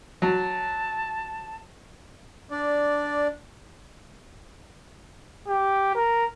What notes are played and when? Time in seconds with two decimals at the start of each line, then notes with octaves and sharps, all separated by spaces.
0.22 F#3 A5
2.51 D4 D5
5.48 G4
5.95 A#4